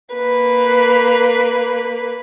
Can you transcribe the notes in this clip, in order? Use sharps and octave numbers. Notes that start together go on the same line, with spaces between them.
A#3 B4